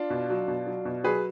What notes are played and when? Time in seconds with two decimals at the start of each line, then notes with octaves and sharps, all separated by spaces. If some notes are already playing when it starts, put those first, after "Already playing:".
Already playing: D4 F4
0.10 B2
0.30 F#3
0.48 B2
0.67 F#3
0.85 B2
1.04 F#3 G#4 B4